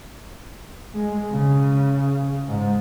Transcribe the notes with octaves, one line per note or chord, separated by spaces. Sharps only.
G#3
C#3
G#2